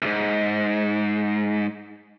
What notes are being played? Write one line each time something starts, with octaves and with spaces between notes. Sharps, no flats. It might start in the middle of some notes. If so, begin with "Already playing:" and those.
D2 G#2